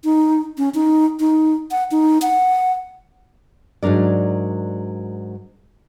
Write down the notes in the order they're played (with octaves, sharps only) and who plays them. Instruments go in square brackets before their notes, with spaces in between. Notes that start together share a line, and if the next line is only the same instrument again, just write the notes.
[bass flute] D#4
C#4
D#4
D#4
F#5
D#4
F#5
[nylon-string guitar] G#2 F#3 D4 A#4 D5